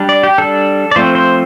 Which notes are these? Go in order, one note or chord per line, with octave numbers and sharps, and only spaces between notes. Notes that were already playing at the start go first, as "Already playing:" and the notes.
Already playing: G3 D4
D5
G4
G3 D4 A4
D5
F3 A3 C4 C5
C5